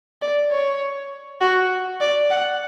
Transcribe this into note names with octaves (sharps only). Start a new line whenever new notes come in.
D5
C#5
F#4
D5
F#5